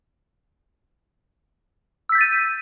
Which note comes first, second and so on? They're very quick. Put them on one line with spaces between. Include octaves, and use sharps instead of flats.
E6 B6 G6 A6 D#7